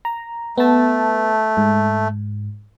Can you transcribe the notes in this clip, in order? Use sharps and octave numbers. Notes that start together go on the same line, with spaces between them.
A#5
A3 B3 A5
G#2